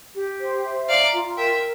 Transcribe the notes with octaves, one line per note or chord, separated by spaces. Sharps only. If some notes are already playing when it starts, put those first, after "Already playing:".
G4
C5
E5
D5 F5 A#5
F4
A#4 E5 G5